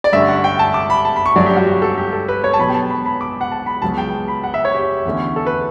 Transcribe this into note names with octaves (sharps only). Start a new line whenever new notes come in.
D5
G2 D3 A3 C#4 E5
F#5
G5
A5
D6
B5
A5
B5
C#6
G2 F#3 A3 C#4 D5
G4
F#4
G4
A4
G4
A4
B4
C#5
A5
B2 F#3 B3 B5
G5
A5
B5
B5
D6
F#5
A5
B5
C#2 C#3 F#3 B3 A5
G5
B5
F#5
E5
C#5
G4
E2 D3 A3 C#4
A4
B4